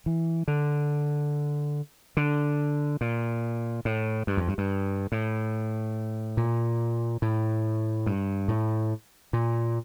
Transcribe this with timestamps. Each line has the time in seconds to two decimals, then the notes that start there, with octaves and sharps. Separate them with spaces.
0.06 E3
0.48 D3
2.17 D3
3.01 A#2
3.85 A2
4.27 G2
4.37 F2
4.48 G2
4.58 G2
5.12 A2
6.37 A#2
7.22 A2
8.06 G2
8.48 A2
9.33 A#2